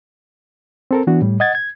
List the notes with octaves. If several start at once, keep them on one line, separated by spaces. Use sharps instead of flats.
C4 A4 A#4
E3 B3 D4 F#4
A2 G3
D#5 F#5 G#6 A6
G#6